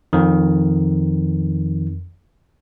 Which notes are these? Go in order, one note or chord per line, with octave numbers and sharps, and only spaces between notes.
F2 D#3